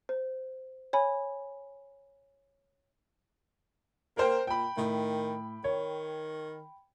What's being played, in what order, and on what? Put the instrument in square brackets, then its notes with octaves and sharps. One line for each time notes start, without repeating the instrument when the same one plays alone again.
[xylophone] C5
C#5 G#5 B5
[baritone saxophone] A#3 [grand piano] A#4 C5 G5
[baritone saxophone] A#2 [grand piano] G5 B5
[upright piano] A2 [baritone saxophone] D#3
[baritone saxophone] D#3 [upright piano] C#5